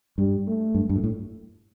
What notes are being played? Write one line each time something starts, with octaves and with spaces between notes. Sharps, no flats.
G2 G3
A3
G2
G2
A#2
A2